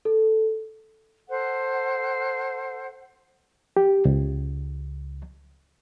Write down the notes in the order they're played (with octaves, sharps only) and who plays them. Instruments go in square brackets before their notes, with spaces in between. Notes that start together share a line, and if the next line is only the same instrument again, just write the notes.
[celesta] A4
[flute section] A4 C5 F#5
[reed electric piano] G4
C#2